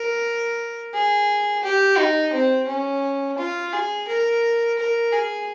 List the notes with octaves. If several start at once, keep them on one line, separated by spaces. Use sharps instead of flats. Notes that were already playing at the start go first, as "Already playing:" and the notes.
Already playing: A#4
G#4
G4
D#4
C4
C#4
F4
G#4
A#4
A#4
G#4